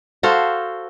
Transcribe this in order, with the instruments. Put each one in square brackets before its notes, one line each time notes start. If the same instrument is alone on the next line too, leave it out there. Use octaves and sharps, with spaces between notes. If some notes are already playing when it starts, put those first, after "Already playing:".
[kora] F#4 A4 C5 F5